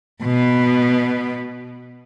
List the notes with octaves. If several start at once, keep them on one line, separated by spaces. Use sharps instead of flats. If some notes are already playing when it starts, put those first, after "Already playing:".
B2 B3